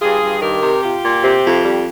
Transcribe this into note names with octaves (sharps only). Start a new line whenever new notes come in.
G2 F4 G#4
G2
D#3 G4 A#4
C3
F4 G4
A#2
C3
F2
G3